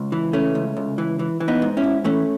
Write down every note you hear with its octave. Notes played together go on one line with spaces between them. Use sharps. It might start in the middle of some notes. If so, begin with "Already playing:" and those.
Already playing: C#2
E3
C#3 A3 C#4
C#2
C#2
E3
E3
E3
B3 D#4
G#2
C#4 E4
G#2
E3 A3 C#4